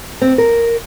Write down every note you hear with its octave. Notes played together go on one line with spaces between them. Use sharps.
C4
A#4